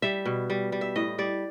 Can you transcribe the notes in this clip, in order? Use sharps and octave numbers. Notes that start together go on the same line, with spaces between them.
G3 E5
B2
G3
G3
E5
A2 D#5
G3 D5